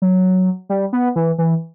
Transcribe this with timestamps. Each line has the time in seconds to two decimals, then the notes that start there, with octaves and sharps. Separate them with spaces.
0.02 F#3
0.70 G3
0.93 B3
1.16 E3
1.38 E3